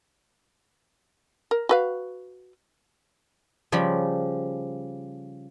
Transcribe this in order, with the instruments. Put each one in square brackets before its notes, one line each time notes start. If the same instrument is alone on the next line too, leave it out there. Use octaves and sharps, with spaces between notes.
[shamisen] A#4
F#4 B4 F5
[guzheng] C#3 F3 G3 B5